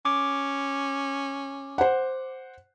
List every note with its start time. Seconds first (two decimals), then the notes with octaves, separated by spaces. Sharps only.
0.05 C#4 D6
1.78 C5 F#5